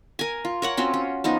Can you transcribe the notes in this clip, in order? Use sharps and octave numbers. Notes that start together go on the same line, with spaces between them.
A#4 G#5
F4
A#4 C#5 F#5
C4 C#4 F4 F#4
C#4
F3 B3 D#4